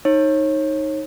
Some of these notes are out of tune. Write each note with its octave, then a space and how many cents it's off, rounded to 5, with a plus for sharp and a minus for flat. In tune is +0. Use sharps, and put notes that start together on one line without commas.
D#4 +0 C#5 -30